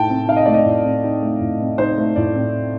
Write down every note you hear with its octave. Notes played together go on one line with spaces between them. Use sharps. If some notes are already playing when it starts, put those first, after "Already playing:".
Already playing: A2 A3 D#4 G5 A5
C4
D#4 F5
D#5
A3 D5
D#5
A2
C4
D#4
A3
A2
C4
D#4 C5
A3
A2 D5
C4